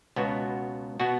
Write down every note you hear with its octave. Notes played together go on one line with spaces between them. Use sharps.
C#2 B2 B3 F#4
B2 B3 F#4